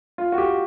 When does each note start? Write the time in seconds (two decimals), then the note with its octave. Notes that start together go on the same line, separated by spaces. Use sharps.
0.18 F4
0.32 F#4
0.38 G4